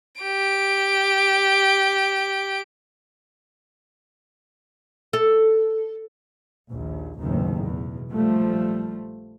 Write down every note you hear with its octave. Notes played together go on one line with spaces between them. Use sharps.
G4 D7
A4
A#1 D#2
F#1 D#2 A2 C3 D#3
E2 B2
A#1 F3 G3 A3